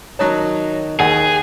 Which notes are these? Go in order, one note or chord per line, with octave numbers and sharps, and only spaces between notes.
D#3 F#3 D#4 C#5 A5
D#2 D#3 G#4 F#5